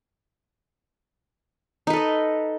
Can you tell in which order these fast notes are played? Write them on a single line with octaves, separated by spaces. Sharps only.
D#4 B4 A4 D#5